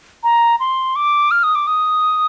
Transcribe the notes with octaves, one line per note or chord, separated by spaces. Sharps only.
A#5
C6
D6
F6
D#6
D6
D#6